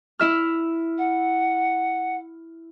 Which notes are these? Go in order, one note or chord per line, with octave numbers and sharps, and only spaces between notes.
E4 E5 F6
F#5